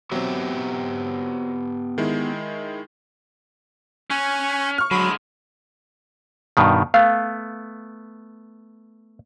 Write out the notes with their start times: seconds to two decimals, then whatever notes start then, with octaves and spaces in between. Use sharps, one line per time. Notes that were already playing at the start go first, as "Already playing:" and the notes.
0.12 F#3 B3 C4 G4 E5
1.98 D#3 G#3 E4
4.10 C#4 G#5 C#6 F#6
4.78 C#6 F6
4.91 D3 F#3 G#3 B5
6.57 G2 B2 D#3
6.94 A3 B3 F5